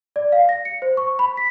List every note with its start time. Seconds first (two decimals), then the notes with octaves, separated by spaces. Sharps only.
0.16 D5
0.32 F5
0.49 A#6
0.65 C#7
0.82 C5
0.97 C#6
1.19 B5
1.37 B6